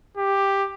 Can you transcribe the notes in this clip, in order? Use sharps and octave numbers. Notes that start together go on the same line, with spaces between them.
G4